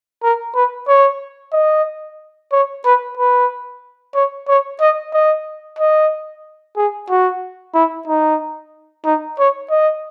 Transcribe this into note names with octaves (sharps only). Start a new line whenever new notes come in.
A#4
B4
C#5
D#5
C#5
B4
B4
C#5
C#5
D#5
D#5
D#5
G#4
F#4
E4
D#4
D#4
C#5
D#5